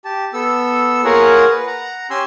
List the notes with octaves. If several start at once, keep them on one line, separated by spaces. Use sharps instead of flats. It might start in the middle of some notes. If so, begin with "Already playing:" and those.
G4 A5
B3 A4 E6
A#3 F4 G#4 A#4 C#5 F#5
B4
F#5 A#5
C#4 G4 G#5 C6 E6